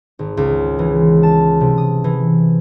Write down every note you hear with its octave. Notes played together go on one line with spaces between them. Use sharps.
G#1
C#2
E3
A5
C3
D#6
E3